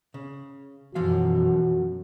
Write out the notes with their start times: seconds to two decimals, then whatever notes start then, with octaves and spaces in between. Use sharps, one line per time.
0.14 C#3
0.95 F#2 B2 E3 F3 F#4 F5